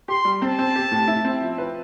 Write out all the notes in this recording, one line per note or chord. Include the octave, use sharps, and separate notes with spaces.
G4 C6
G3
C4 A5
C4
G4
A2
E4
C4
F3
B4